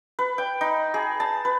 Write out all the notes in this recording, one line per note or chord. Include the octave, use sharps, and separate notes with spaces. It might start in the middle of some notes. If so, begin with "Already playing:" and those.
B4
G5
D#4
G#4
A5
B4